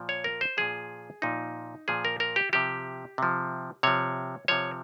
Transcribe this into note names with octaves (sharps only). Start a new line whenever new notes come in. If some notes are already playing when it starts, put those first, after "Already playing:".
Already playing: A#2 F3
C#5
A#4
C5
A#2 F3 G#4
A#2 F3 D#4
A#2 F3 G#4
A#4
A#4
G4
C3 F3 G4
C3 F3
C3 F3 C#5
C3 F3 C#5